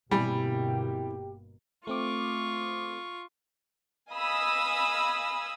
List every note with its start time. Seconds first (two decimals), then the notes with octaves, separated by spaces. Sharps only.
0.11 G1 B2 G3 A#3 C4 E4 G4 G#5
1.87 A3 C4 F4 C#6 D6
4.11 D#5 F5 G#5 B5 D#6 E6